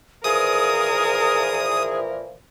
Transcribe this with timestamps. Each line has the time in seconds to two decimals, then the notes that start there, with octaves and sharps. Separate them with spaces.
0.24 A#2 E3 F3 G#4 A#4 D#6